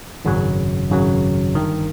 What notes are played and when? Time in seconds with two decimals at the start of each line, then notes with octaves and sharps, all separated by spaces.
0.25 G#1 F#2 C#3 F#3
0.89 G#1 F#2 C#3 F#3
1.55 G1 G2 D#3